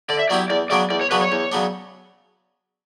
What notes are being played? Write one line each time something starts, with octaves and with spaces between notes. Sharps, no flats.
D3 D5
E5
F#3 B3 E4 G4 D5
E2 D5
C#3 F#3 B3 D4 D5
E2 D5
C#5
C#3 F#3 B3 D4 B4
C#5
E2
C#3 F#3 B3 D4